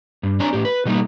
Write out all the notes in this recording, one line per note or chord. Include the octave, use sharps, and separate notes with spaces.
G2
C4 D4 C#5 D5 G#5 A#5
A2 G4
B4
B2 F#3 G3 A3 A#3 D#4